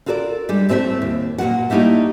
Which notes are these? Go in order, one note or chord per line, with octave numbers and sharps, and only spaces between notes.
F4 F#4 A4 A#4 C#5 D5
G3 G#3 D4
A2 A3 C4 A4 C5 E5
D#2
A#2 A#3 F4 F#4 F#5
G3 A3 A#3 D#4 E4 G4